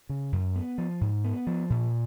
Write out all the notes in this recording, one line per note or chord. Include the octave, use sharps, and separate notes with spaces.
C#3
F#2
B3
F3
G#2
B3
F3
A#2